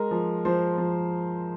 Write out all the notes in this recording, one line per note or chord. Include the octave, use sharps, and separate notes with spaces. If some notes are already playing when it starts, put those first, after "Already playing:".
Already playing: G#3 A#4
F3
F3 C5
F3